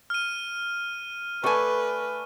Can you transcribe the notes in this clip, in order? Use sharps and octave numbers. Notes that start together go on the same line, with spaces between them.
F6 D#7
A3 A4 B4 D5 G#5 C#6